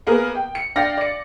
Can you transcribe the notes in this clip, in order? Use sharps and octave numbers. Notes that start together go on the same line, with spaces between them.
A#3 B3 G#4 A#4
G5
C#7
D4 F5 G5 A#6
D5 C#7